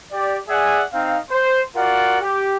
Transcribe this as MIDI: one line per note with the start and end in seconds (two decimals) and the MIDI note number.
0.12 0.37 67
0.12 0.37 74
0.49 0.83 68
0.49 0.83 74
0.49 0.83 76
0.49 0.83 78
0.49 0.83 80
0.93 1.17 60
0.93 1.17 63
0.93 1.17 77
1.30 1.61 72
1.76 2.17 65
1.76 2.17 66
1.76 2.17 70
1.76 2.17 74
1.76 2.17 78
2.22 2.56 67